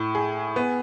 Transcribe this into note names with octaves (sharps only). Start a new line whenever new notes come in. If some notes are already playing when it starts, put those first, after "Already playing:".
Already playing: A2
G#4
B3